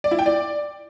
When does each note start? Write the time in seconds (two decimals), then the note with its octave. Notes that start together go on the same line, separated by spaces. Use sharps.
0.04 D5
0.11 E4
0.19 G5
0.26 D5